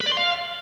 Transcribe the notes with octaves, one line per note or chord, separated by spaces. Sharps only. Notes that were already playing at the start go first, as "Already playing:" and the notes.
B4
D5
C6
F5